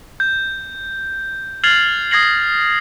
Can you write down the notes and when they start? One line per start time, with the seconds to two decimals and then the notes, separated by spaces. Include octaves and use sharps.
0.20 G6
1.64 F6 G#6 A6 C7 F7 F#7
2.11 D#6 G#6 A#6 C7 F#7